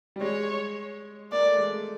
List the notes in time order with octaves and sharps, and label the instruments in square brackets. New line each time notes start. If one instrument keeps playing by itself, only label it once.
[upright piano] G3
[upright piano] G#3 [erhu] C#5
[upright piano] A#3 [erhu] D5
[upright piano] A3
G#3
A3